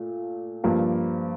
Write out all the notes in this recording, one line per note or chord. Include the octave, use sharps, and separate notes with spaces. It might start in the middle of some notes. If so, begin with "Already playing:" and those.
Already playing: A#2 A3
G2 F3 A#3